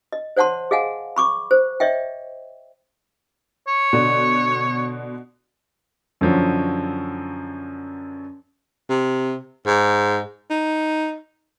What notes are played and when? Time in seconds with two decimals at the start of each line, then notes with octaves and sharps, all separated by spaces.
0.13 D#5
0.37 C5 C#5 F#5 A5 C6
0.71 G#4 D#5 F5 F#5 G#5
1.16 B5 C#6 D6
1.51 C5
1.80 C#5 D#5 E5 G5
3.68 C#5
3.93 B2 D3
6.21 F#2 D3 F3 F#3
8.89 C3
9.66 G#2
10.50 D#4